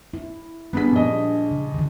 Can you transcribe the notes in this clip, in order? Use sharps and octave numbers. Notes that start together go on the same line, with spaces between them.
E4
G3 B3 D4 G#4 B6
A#1 D#5
C#3
D3 E3